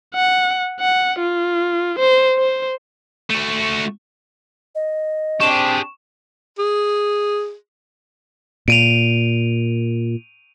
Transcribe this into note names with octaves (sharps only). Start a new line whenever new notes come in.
F#5
F#5
F4
C5
C5
A3 F#4
D#5
C4 D4 G4 G#4 C#6 E7
G#4
A#2 D7 D#7 F7